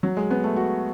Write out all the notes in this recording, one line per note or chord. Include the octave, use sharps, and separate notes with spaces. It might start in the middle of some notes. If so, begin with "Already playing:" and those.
F#3
G#3
B3
A3
F#4